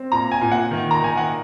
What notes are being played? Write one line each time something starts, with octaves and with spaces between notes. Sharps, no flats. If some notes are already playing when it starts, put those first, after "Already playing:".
Already playing: C4
A#2 A#5
G#5
A#2
F#5
D#3
A#5
D#3 G#5
F#5